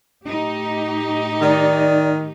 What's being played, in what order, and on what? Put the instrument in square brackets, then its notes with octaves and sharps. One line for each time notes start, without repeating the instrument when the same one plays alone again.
[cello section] A2 D#4 G4
[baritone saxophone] D#3 [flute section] D5